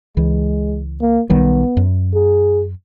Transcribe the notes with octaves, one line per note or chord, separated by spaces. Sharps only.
C#2 E3 G#3
A#3
B1 D#3 G3 B3
F#2
G#4